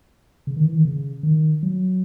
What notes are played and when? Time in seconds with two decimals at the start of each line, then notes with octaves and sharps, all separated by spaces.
0.47 C#3
0.56 D#3
0.65 E3
0.75 D#3
0.85 C#3
1.23 D#3
1.63 F#3